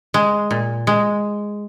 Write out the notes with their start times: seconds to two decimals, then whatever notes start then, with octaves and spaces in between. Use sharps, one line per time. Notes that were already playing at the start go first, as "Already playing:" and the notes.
0.14 G#3
0.51 A#2
0.87 G#3